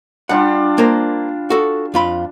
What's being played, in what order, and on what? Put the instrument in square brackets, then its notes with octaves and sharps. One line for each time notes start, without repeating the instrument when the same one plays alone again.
[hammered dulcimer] G3 D4 F4 [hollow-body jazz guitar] F#5
[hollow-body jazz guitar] A#3 A#4 C5
F#4 A4
F2 F4 B5